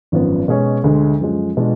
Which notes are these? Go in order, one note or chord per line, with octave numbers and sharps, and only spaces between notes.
G#1 F#2 F3 B3
B2 G#3 C#4 G#4 C#5
D2 D3 G#3
F#2 F3 G#3
B2 G#3 D4 F4